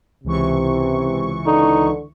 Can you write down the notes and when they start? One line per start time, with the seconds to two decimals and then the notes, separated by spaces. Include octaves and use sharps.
0.24 C#2 C3 E3 C#6
1.46 D3 D#4